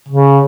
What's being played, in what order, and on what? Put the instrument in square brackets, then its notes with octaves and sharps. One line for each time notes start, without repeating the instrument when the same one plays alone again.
[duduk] C#3